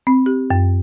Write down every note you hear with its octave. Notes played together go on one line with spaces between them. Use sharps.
C4
G4
F#2